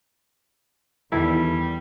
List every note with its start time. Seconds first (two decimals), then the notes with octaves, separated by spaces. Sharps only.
1.12 E2 D#3 E3 G3 E4 A4